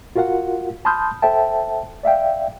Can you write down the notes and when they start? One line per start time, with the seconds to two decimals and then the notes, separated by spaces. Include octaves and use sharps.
0.16 F4 F#4 A#4 F5 F#5
0.85 A5 B5 C6 D#6 F6 G6
1.22 A4 C5 E5 G5 A5
2.03 D5 E5 F5 G5